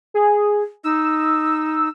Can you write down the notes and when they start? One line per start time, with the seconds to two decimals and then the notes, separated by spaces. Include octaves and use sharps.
0.14 G#4
0.84 D#4 E6